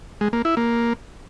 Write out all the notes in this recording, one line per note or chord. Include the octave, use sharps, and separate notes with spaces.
G#3
A#3
E4
A#3